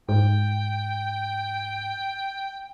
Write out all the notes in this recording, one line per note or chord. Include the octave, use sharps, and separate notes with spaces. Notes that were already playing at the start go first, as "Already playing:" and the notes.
G#2 G5